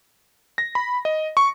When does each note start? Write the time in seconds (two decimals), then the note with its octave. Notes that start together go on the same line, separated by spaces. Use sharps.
0.58 A#6
0.75 B5
1.05 D#5
1.37 C#6